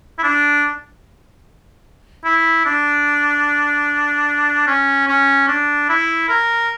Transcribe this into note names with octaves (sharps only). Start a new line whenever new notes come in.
E4
D4
E4
D4
C#4
C#4
D4
E4
A#4